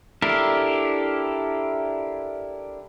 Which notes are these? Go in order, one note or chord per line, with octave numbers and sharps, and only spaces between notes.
D4 E4 G4 A4 A#4